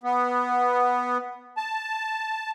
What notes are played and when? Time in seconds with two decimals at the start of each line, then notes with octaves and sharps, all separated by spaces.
0.04 B3
1.57 A5